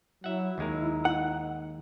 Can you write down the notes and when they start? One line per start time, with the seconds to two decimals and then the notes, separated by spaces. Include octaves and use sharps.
0.24 F#3 E4 E5 F#5
0.58 D#2 G#3 D#4 A#4
1.05 F#5